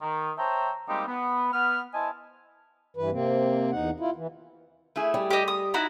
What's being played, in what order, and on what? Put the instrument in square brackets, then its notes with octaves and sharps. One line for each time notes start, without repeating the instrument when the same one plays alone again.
[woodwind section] D#3
C5 C#5 E5 G5 A5 A#5
G3 G#3 A#3 C4 D#4 G4
B3
B3 F6
E4 C5 D#5 G#5 A5
[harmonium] G2 E3 B4
C3 A#3 C4
E2 D#4 F#5
E4 F4
E3
[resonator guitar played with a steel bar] A3 E4 G#4
[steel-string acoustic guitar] G3
[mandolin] G4 D#5
D#6
D#4 E4 F#4